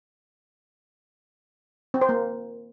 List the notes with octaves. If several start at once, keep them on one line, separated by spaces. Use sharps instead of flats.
C4
C5
A#3